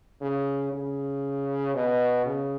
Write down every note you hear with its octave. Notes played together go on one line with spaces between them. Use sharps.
C#3
C#3
B2
C#3